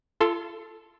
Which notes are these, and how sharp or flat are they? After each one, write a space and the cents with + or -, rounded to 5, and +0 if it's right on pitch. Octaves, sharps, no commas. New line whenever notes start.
F4 -35 A4 +0 C6 +0